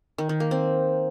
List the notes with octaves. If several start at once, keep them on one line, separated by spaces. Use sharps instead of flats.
D#3
D#3
A#3
C4